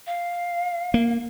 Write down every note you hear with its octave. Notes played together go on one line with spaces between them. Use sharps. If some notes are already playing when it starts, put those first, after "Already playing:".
F5
A#3